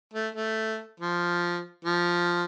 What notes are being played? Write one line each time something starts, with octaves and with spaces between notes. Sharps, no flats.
A3
A3
F3
F3